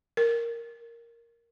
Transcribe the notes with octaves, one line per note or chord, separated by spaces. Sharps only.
A#4